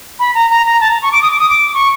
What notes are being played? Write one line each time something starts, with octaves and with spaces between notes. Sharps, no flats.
B5
A#5
A#5
A#5
A5
A#5
C#6
D6
D#6
D6
D#6
D6
C#6